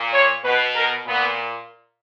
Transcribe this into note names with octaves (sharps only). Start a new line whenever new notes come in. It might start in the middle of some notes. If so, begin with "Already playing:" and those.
Already playing: A#2
C#5
B2 B4
A#4
A#2 B3